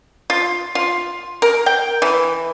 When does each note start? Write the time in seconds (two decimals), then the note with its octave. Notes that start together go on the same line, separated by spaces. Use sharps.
0.30 F4
0.75 F4
1.42 A#4
1.66 G5
2.02 E3